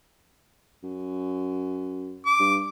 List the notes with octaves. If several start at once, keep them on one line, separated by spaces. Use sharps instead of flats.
F#2
D6
G2